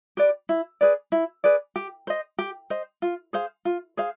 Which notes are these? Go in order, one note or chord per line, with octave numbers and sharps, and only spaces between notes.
G4 B4 D5
E4
G#4 B4 D5
E4
G#4 B4 D5
G4
C5 D#5
G4
C5 D#5
F4
G#4 C5 F5
F4
G#4 C5 F5